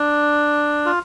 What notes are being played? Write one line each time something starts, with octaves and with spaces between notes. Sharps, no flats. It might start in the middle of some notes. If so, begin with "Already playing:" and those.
Already playing: D4
F4